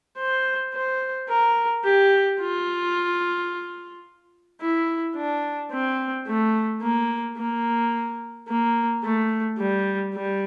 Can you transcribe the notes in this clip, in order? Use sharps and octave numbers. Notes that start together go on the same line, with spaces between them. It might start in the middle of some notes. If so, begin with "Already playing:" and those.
C5
C5
A#4
G4
F4
E4
D4
C4
A3
A#3
A#3
A#3
A3
G3
G3